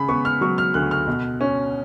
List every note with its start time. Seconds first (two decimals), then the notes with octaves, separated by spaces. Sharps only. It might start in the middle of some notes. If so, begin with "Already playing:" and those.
Already playing: C#3 B5
0.09 B3 C#6
0.25 F6
0.41 F#3 C#6
0.58 F6
0.74 D2 F#6
0.91 F6
1.07 B2
1.41 C#4